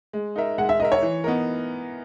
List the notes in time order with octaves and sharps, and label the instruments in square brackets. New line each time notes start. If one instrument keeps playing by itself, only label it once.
[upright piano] G#3
D#4 A#4 E5
[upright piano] G#3 [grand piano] F#5
[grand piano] E5
[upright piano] D#4 A#4 E5 [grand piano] D#5
[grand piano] C#5
[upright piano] E3
B3 D#4 A#4